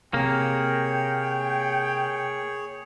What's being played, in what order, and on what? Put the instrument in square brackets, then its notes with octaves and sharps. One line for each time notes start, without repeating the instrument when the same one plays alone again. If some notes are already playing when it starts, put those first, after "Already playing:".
[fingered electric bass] C3 [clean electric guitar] A#3 [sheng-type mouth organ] G#4 C#5 [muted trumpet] G5